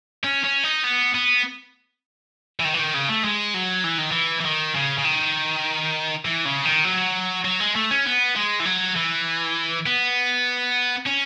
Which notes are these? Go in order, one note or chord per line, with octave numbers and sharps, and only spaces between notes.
C#4
C#4
D#4
B3
B3
E3
D#3
E3
D#3
C#3
A3
G#3
F#3
E3
D#3
E3
E3
D#3
C#3
C#3
D#3
E3
C#3
D#3
F#3
F#3
G#3
A3
C#4
B3
G#3
E3
F#3
E3
B3
C#4